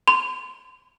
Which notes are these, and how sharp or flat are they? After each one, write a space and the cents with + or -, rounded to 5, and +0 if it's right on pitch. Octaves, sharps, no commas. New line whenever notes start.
C6 -20